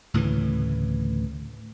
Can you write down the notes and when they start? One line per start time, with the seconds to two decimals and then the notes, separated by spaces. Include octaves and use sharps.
0.14 D2 A2 C#3 E3